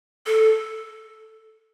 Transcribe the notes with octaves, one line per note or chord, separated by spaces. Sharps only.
A4